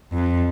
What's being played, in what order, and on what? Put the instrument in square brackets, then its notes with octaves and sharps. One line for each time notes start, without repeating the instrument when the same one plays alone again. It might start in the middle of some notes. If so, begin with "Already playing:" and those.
[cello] F2